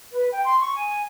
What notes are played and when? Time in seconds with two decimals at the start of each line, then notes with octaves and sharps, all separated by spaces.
0.13 B4
0.31 G5
0.45 C6
0.60 C#6
0.74 G#5